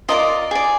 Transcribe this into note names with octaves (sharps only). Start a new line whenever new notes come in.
F4 A#4 D5 D#5
G#4 D5